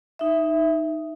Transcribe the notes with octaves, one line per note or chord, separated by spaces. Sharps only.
D#4 E5